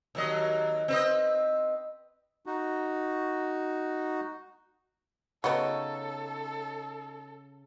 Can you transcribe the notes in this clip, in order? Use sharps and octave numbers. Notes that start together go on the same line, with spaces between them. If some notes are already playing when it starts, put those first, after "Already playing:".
D#2 F#3 D#5
C4 B4 D#5
D#4 F#4
C#3 B3 D#4 F#4 A4 C#5